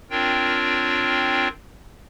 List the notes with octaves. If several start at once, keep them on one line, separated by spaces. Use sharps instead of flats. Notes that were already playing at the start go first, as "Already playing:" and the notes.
C4 D4 F4 A#4 C#5 G5